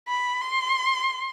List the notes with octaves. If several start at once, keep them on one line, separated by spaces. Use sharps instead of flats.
B5
C6